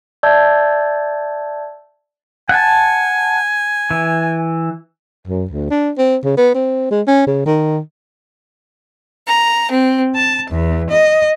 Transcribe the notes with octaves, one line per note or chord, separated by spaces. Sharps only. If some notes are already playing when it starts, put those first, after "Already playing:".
D5 E5 A5 E6 G6 G#6
F#5 G#5 A5
E3
F#2
D2
D4
C4
C#3
B3
C4
G#3
C#4
C#3
D#3
A#5
C4
A5
E2
D#5